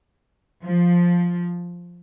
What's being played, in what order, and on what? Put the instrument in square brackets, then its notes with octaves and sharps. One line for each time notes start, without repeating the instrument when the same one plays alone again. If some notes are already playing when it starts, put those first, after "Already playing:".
[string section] F3